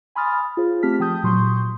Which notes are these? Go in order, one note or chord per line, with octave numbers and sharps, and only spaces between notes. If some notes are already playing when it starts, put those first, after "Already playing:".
G#5 B5 C6 D#6 F6 A6
F4 G#4 C5
A3 C4 G4 A5 F6 B6
F3 G5 A5 D#6 G6
A#2 F#3 C6 C#6 D#6 G6